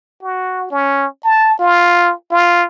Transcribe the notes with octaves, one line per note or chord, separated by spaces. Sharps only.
F#4
C#4
A5
F4
F4